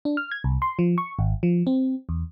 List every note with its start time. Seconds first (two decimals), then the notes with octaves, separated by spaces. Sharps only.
0.05 D4
0.17 F6
0.32 G#6
0.44 C2
0.62 C6
0.79 F3
0.98 C#6
1.19 G#1
1.43 F3
1.67 C4
2.09 E2